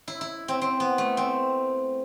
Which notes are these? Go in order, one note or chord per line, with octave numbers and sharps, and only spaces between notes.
E4
E4
C4
C4
B3
A3
C4